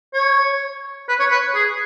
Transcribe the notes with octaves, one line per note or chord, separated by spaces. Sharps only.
C#5
B4
C#5
B4
G#4